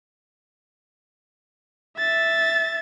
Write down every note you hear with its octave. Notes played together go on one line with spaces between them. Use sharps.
E5 A6